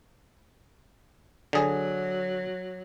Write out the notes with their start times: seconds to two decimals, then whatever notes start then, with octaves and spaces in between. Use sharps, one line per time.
1.53 D3 F#3 G#4